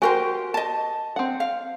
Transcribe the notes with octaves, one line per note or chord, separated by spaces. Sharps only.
F#4 G4 A#4 C5 G5 G#5
D#5 A5
C4 F#5
F5